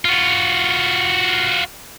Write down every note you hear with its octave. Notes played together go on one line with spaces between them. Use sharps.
F4 F#4